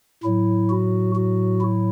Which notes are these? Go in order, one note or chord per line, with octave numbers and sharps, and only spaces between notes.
A2 F#3 E4
F#4
F#4
E4